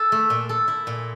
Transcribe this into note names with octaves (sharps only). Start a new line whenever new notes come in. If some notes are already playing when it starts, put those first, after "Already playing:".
Already playing: A4
A3
A#2
A4
E4
A#2